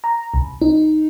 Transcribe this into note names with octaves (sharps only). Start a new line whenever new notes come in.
A#5
C2
D#4